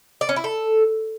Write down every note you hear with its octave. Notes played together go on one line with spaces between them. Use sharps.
D5
C#4
E4
A4